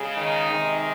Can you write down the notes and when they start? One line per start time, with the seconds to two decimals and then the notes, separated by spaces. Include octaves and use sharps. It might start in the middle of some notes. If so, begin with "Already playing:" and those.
Already playing: C#3 G#3
0.16 D#3 D#4
0.50 C3 D#3 G#3